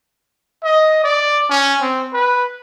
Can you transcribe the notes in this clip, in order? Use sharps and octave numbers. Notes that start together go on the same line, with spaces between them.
D#5
D5
C#4
C4
B4